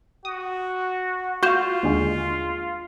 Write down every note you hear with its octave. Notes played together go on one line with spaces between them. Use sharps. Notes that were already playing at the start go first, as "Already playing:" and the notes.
F#4 D#6
F4 F#4 F5 C#6 G6 E7
D#2 D3 G#3